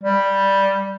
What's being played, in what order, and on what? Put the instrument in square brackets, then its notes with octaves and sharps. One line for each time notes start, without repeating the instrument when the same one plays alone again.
[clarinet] G3